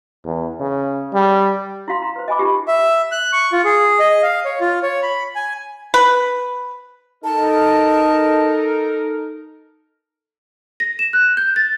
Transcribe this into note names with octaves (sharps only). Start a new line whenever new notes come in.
E2
C#3
G3
E4 F#4 F5 C6
A#5
B4 C5
D#5 G#5 B5 D6
D#4 F4 G4
E5
F#6
C#6
F4
G#4
D#5
F5
C#5
F4
C#5
B5
G#5
B4
D#4 A4 A#4 A5
A#6
E7
F#6
G6
A6